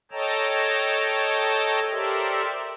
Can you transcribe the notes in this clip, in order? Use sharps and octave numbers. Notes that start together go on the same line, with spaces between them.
A4 C#5 D#5 G5 A5 A#5
G4 A4 A#4 C5 D5 E5